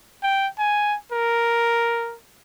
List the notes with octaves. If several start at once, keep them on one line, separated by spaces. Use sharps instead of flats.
G5
G#5
A#4